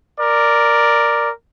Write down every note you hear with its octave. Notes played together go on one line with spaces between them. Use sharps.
A#4 D5